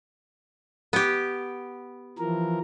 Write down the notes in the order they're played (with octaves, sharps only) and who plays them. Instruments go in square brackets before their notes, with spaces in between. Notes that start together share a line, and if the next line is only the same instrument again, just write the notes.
[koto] B3 G4
[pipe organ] E3 F3 A#4